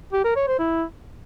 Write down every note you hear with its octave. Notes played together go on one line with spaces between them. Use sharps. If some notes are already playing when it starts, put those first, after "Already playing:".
G4
A#4
C#5
C5
E4